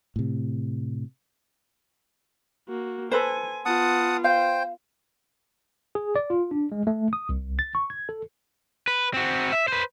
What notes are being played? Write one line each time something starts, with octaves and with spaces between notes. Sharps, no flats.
A2 C3
A#3 F#4
A4 B4 C5 G#5
B3 F4 F#5 A5 D#6
C5 F5 G5
G#4
D5
F4
D4
G#3
A3
D#6
C2
A6
C#6
G#6
A4
B4
C4 F#4
E5
B4 C5